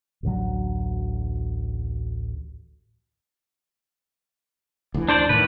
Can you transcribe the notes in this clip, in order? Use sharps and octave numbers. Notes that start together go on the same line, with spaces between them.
A1 D2 D3 F#3
D2 E3
D4 C5 D5
A2 D#3 B4